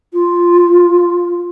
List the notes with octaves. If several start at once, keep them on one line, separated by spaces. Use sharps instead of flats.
F4